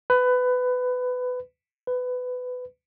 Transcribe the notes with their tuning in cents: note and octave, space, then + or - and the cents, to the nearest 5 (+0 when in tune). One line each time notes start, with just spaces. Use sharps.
B4 +20
B4 +20